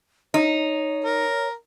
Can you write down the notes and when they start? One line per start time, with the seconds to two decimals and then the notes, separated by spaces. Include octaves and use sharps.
0.34 D#4 C#5
1.04 A#4